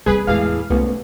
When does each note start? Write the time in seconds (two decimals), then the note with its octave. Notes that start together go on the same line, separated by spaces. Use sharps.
0.06 G3 C4 G#4 B4
0.27 E2 A2 E3 G#3 G#4 F5
0.70 C2 A3 B3 C#4